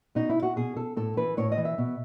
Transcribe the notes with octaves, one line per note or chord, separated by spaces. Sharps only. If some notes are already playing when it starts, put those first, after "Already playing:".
B2 D#4
E4
F#4
B2 G#4
A4
A2 A4
E3 B4
A2 C#5
D#5
E3
E5
B2